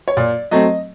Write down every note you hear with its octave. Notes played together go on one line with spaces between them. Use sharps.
C#5
A#2 D5
F#3 A3 C4 D#5